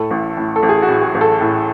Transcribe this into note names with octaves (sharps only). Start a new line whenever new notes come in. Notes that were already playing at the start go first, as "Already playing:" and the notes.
Already playing: A2 A4
A1
A2
A4
A1
G#4
F#4
A2
G#4
A1
A4
A2